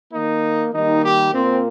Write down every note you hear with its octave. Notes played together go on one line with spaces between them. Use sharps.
D#3 A#3 D#4
D#3 G3 A#3 D#4
G4
A#2 A#3 C4